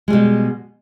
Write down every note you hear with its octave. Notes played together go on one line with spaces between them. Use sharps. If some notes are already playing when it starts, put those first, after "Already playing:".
B2 G3 G#3